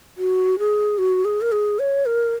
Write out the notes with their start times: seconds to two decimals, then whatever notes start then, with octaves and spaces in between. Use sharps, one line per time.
0.18 F#4
0.59 G#4
0.98 F#4
1.25 G#4
1.41 A#4
1.52 G#4
1.79 C#5
2.06 A#4